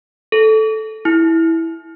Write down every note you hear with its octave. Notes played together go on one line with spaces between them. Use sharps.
A4
E4